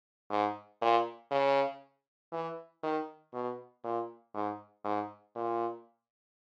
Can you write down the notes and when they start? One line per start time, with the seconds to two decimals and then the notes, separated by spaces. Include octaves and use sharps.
0.31 G#2
0.82 A#2
1.31 C#3
2.33 E3
2.83 D#3
3.34 B2
3.84 A#2
4.34 G#2
4.85 G#2
5.36 A#2